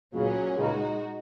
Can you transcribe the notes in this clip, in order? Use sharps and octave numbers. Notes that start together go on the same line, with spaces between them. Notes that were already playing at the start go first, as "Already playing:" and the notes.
C#2 A#2 C#3 F#3 C#4 G#4
C#2 C#3 G#3 D#4 F#4